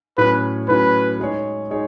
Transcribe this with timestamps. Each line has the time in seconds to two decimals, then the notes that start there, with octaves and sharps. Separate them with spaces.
0.18 A2 F#3 C#4 B4
0.68 A2 F#3 C#4 B4
1.20 G#3 D#4 G#4 C#5
1.70 G#3 D#4 G#4 C#5